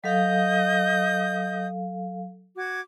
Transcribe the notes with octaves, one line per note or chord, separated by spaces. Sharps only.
F#3 A4 D#5 F5 D#6 G6
F#4 D6 G#6